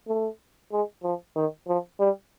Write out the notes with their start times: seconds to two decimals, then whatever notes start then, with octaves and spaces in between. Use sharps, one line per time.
0.08 A3
0.72 G#3
1.03 F3
1.36 D#3
1.68 F3
2.00 G3